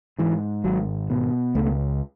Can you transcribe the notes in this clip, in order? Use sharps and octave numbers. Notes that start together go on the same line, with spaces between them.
G#2 E3
G#1 F#3
B2
C#2 A3